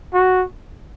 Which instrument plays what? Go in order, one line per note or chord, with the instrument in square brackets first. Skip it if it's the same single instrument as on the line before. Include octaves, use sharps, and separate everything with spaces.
[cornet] F#4